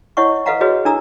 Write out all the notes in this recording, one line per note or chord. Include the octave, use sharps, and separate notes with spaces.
E4 C#5 D#5 F#5 C#6
A4 B4 D#5 F5 F#5 A#5
F#4 G#4 B4 C#5 D#5
D4 E4 A4 A#5 E6